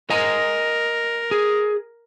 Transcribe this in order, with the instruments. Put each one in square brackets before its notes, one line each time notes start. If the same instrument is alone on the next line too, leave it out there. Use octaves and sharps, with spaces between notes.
[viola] A#4 [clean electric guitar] D#5 G#5 A#5
[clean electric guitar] G#4